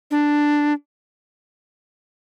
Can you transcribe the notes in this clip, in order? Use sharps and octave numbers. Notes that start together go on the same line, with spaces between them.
D4